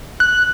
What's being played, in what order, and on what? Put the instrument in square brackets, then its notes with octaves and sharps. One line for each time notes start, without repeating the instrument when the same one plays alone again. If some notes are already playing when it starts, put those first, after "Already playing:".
[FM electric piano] F#6